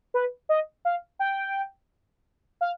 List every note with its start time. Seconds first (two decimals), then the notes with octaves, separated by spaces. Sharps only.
0.14 B4
0.49 D#5
0.85 F5
1.19 G5
2.61 F5